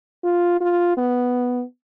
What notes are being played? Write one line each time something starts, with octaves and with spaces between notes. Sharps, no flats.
F4
F4
B3